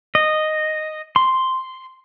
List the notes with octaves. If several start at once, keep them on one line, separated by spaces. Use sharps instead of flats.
D#5
C6